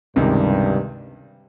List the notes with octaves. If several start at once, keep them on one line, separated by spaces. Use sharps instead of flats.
C#2 G2 C3 D#3